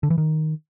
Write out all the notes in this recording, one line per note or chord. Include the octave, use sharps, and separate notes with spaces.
D3
E3
D#3